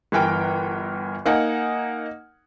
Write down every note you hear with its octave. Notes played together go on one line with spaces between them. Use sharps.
G1 E3 A#4 G5
A#3 D#4 F#5 G#5